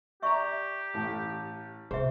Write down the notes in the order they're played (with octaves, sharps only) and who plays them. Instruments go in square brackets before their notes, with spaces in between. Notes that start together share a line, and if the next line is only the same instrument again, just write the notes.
[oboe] G4 [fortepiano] D5 A#5 [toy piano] E5 C#6
[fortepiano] A1 A2
[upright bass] C3 [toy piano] G#4 E5 [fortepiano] C5